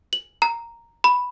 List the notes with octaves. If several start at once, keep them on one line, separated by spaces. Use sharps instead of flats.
F#7
A#5
B5